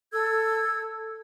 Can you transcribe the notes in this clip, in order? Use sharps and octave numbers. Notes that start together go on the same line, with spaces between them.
A4 E6 G#6